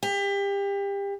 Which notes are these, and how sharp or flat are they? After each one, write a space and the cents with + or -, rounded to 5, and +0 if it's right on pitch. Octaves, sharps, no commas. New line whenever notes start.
G4 +30